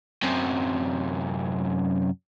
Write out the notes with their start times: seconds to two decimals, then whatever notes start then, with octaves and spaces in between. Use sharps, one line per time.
0.23 F#2 C3